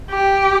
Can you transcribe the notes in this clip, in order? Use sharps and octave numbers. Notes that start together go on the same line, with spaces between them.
G4